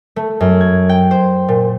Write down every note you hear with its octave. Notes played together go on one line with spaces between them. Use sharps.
A3
F#2
G#6
G5
C5
A#2